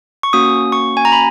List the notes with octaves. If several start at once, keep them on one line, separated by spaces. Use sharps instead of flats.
C#6
A#3 C#4 F#4 D#6
C#6
G#5
A#5
B5